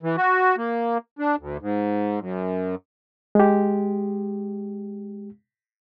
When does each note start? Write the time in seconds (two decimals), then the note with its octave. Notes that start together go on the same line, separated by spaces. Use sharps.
0.03 E3
0.17 F#4
0.58 A#3
1.19 D4
1.39 D2
1.61 G#2
2.20 F#2
3.35 G#3 G4